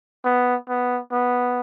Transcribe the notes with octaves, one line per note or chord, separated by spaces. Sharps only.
B3
B3
B3